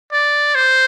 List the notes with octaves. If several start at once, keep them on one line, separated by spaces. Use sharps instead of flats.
D5
C5